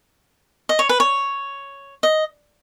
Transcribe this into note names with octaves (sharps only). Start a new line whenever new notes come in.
D#5
C#5
B4
C#5
D#5